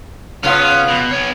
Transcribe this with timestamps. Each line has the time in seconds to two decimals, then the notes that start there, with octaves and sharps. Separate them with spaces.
0.43 C#3 B3 C#4 F4
0.88 B2
1.11 B3 C#5